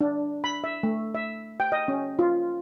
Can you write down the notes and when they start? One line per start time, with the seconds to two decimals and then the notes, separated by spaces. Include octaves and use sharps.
0.01 D4
0.44 B5
0.64 E5
0.83 A3
1.14 E5
1.60 G5
1.72 D#5
1.88 C#4
2.19 F4